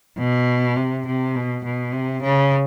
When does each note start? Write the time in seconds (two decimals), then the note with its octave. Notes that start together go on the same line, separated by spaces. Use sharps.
0.19 B2
0.76 C3
1.07 C3
1.36 B2
1.65 B2
1.93 C3
2.22 C#3